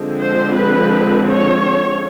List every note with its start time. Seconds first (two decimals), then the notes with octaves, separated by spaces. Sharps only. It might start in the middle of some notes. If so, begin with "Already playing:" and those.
Already playing: D3 F3 G#3 C4
0.18 C5
0.54 B4
1.27 C#5